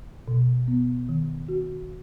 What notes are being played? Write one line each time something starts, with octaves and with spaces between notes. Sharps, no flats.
B2
B3
D#3
F#4